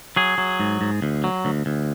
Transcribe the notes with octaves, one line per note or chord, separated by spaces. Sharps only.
F#3 G#4
F#3
G#2
G#2
D2
F#3
D2
D2